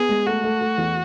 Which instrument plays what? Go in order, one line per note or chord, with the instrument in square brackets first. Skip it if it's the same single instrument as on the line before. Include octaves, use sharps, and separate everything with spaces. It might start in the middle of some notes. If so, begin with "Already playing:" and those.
Already playing: [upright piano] B3 [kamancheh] G#4
[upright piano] G#3
[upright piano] A3 [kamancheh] F#4
[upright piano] A3
A3
E2